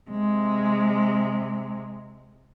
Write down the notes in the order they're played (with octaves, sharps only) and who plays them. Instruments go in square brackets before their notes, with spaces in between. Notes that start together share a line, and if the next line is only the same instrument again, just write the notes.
[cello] C3 G#3